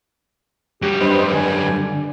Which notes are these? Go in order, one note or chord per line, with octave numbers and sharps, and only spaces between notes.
F#2 G3 G4
G2 B4 C5 D#5
D3 G#5